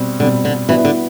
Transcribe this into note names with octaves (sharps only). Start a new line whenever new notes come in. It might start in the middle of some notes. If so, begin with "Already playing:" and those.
Already playing: B2 G3 C4
B2 D3 G3 C4
D3
E3 G3 B3 D4 F#4 B4
D3